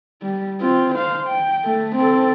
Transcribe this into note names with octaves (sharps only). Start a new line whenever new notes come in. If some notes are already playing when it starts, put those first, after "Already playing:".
G3
C4 F4
C5 F5
G5
A3
C4 A4